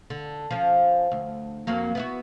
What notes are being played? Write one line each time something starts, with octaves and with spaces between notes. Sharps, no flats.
D3
F3 C#4
D2
F2 F#3 A#3
B3 E4 F#4